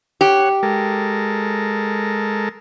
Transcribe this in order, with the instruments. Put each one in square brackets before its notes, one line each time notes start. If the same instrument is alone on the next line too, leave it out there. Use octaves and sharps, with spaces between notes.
[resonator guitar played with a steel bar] G4 [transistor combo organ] C#5 F#5
[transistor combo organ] G#3 A4 A#4